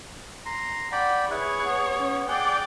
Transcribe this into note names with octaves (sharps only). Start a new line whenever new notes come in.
A#5 C6
D5 F#5 G5 B5
E4 G#4 B4 C#5
B3
C#4
G#4 D5 F#5 G5